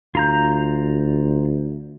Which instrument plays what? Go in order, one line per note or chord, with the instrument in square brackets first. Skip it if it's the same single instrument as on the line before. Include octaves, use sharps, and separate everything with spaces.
[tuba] D2 [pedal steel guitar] F4 A#5 G6